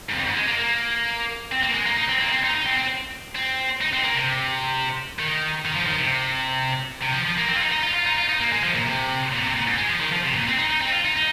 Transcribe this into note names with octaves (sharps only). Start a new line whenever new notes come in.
G#2
F2
G#2
G#3
A#3
A#3
C4
A#3
G#3
A#3
D#4
C4
A#3
D#4
C4
D#4
D#4
C4
C4
C4
D#4
C4
A#3
C3
D#3
D#3
F3
D#3
C3
C3
F3
F3
A#3
C4
F4
D#4
D#4
F4
F4
D#4
F4
D#4
A#3
G#3
F3
A#2
C3
A#2
C3
A#2
G#2
G#3
F3
D#3
F3
C3
A#2
C4
D#4
D#4
C4
F4
D#4
D#4